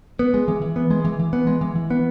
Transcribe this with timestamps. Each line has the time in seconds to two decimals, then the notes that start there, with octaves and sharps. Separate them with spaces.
0.19 B3
0.34 G#3
0.48 E3
0.62 E3
0.76 B3
0.91 G#3
1.05 E3
1.19 E3
1.33 B3
1.47 G#3
1.61 E3
1.75 E3
1.90 B3